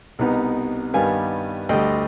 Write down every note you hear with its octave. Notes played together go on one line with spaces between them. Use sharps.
C2 B2 B3 D#4
G2 D#3 G3 B3 F5 G#5
D2 D3 G3 D#5 G5